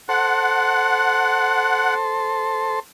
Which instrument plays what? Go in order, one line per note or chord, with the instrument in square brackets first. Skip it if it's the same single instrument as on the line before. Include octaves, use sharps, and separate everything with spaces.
[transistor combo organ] A4 C5 [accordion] F#5